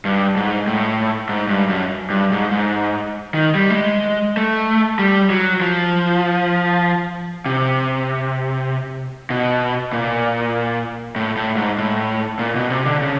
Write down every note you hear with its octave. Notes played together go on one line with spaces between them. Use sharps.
G2
G#2
A2
G#2
G2
F#2
G2
G#2
G#2
D#3
G3
A3
G#3
A3
G3
F#3
F3
C3
B2
A#2
A2
A2
G#2
A2
A#2
B2
C3
D3
C#3